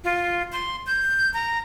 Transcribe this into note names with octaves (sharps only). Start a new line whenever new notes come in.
F4
C6
G6
A#5